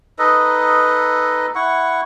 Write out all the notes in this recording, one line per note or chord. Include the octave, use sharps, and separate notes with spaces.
D#4 A4 B4 D#5
E4 F#5 C#6